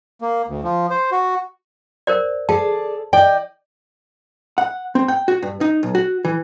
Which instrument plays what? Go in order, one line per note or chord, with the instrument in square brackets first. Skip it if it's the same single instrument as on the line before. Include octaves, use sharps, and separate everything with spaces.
[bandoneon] A#3
D2
F3
C5
F#4
[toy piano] A#4 C5 D5
[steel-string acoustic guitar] G#4 A4 D5 [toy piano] A5
[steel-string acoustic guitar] D5 D#5 [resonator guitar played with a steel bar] G5
[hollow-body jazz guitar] F#5
C4
G5
F#4
G2
D#4
B1
F#4
E3